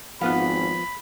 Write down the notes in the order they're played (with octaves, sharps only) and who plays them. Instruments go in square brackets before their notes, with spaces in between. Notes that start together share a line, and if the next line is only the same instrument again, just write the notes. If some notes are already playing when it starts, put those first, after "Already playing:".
[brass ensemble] G#1 [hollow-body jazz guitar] F3 B3 F4 [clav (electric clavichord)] F5 F#5 [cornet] B5